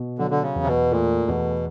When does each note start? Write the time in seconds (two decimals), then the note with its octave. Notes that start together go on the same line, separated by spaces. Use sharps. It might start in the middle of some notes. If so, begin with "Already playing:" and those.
Already playing: B2
0.18 D3 F#3
0.31 D3
0.43 C#3
0.56 E2
0.63 C3
0.67 B2
0.92 A#2 A3
1.27 E2 B2